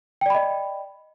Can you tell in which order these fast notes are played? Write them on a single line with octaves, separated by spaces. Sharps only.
G5 D5 B5 D#5